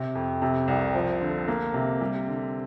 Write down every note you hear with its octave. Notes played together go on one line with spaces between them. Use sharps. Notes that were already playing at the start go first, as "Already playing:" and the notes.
Already playing: C3
F2
C3
C2
F3
D3
A#3
C3
G3
D3